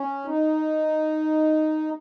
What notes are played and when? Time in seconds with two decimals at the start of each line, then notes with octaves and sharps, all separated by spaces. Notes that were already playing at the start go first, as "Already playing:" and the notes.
Already playing: C#4
0.25 D#4